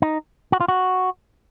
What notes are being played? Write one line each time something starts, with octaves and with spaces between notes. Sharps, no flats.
D#4
F#4
F4
F#4